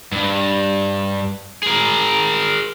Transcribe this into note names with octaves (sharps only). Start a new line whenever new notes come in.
G2
G#4 A#4